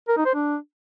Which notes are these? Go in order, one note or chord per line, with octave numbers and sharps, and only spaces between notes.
A#4
D#4
C5
D4